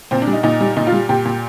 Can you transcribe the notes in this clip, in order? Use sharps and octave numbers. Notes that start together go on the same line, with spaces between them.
A#2 C4
D4
G3
D#4
A#2 D#4
G3
A#2 D#4
F4
G3
A#2 G4
A#2